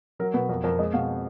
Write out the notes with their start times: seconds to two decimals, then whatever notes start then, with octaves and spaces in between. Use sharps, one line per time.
0.19 F#3 A#4
0.34 B2 B4
0.49 F2 A#4
0.64 F2 A#4
0.79 G#3 D#5
0.93 B2 F5